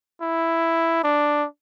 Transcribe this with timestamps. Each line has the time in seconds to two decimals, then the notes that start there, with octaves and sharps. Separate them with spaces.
0.21 E4
1.03 D4